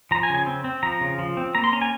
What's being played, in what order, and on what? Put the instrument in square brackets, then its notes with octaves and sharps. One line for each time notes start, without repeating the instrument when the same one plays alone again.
[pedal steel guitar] F3 A#5
G#5
C#3
G#5
C4
C4
F3 A#5
C#3
F3
C4
A#3 A#5
C6
C#4 A#5
G#5